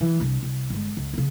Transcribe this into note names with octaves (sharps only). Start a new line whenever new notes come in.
E3
C2 D4
C2
G1 G#3
C#2
C#3 B3